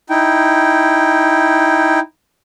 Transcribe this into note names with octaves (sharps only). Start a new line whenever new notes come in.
D#4 E4 G5